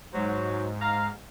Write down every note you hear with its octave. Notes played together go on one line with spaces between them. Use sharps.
G#2 F#3 C5
F5 A#5